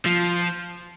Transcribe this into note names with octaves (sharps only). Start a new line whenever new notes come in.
F3